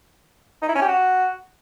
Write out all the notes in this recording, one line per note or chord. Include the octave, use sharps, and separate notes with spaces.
D#4
E4
C#4
G4
F#4